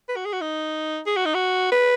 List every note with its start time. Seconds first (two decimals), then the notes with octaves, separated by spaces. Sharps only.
0.09 B4
0.16 F#4
0.25 G#4
0.33 F#4
0.41 D#4
1.06 G#4
1.16 F#4
1.26 D#4
1.34 F#4
1.72 B4